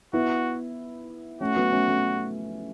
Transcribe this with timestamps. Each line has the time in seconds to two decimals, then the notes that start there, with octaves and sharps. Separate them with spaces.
0.13 B3 E4 F#4
1.41 A3 C#4 F#4
1.56 F#3 B3
1.72 A3 C#4
1.88 A3 C#4